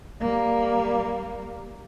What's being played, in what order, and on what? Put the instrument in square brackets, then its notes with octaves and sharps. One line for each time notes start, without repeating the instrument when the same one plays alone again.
[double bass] G3 A#3